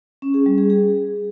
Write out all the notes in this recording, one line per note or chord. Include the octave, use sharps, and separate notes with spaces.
C#4
G#4
G3
G#4
G#4